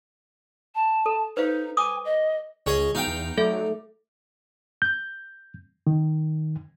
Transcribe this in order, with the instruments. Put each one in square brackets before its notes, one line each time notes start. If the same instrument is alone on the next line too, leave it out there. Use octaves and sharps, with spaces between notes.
[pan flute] A5
[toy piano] A4
[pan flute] D#4 [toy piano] B4 C5 F5
[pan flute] G#5 [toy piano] D6 D#6
[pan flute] D#5
[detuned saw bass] C#2 [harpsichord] C#4 G#4 D#5
[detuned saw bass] B2 [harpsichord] D#4 F5 G5
[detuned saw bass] E2
[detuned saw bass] F#3 [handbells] A3 A4 E5
[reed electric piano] G6
D#3